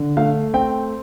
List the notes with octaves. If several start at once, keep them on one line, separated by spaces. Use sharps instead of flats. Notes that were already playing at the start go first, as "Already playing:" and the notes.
Already playing: D3
A3 F5
C4 G5